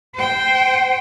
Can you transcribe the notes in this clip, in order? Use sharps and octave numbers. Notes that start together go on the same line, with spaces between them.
C5 G5